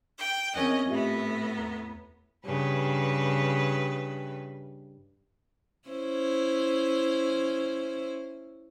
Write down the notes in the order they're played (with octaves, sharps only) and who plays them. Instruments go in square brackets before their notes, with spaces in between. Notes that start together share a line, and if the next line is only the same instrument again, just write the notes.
[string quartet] G5
[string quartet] E2 C#4 D#5 [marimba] C4 A#4 F#6
[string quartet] A2 B3 [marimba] F4 G4 E5
[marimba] E2 A#5
[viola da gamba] G2 C#3 B4
C#4 E4 C5